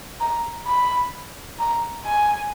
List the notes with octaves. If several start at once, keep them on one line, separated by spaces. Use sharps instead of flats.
A#5
B5
A#5
G#5